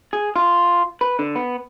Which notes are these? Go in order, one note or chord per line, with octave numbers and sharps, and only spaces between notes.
G#4
F4
B4
D3
B3